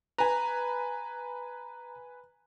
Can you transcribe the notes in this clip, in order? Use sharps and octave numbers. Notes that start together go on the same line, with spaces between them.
B4 G#5 A#5